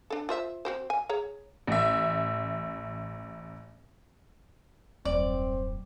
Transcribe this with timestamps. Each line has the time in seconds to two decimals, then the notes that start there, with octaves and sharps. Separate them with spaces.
0.10 D4 A4
0.29 F4 C5 E5
0.65 C4 F#4 C5
0.90 G#5
1.09 G#4 C#5 A#5
1.67 A1 E5
5.05 D#1 F#2 C4 D5